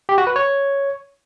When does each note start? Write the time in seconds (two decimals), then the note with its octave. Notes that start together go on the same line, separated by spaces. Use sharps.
0.09 G4
0.18 F#4
0.27 B4
0.36 C#5